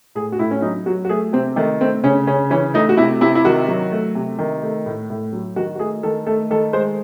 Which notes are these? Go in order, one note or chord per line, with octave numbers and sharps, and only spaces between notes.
A2 G#4
F#4
A2 E4
C#4
F#3 D#4
F#3 F#4
F#4
A3 G#4
C3 C4
D#3 A3
A3 C4
C#3 C#4
C#3 C#4
E3 C#4
A3 D#4
F#4
C3 E4
C3 E4
E4
D#3 F#4
F#3
A3
C3
D#3
A3
A2
A2
F#3
D#3 F#4
F#4
A3 G#4
D#3 A4
A3 A4
D#3 A4
G#3 C5